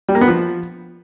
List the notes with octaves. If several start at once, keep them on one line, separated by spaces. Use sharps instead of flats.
G3
A#3
B3
F3